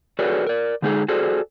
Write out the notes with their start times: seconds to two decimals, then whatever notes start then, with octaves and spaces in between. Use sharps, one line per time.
0.19 F#4 G#4 A4 B4 C#5 D5
0.47 A#4 D5
0.82 D3 G#3 D#4 F4 G#4 A4
1.08 F#4 G#4 A4 C5 D5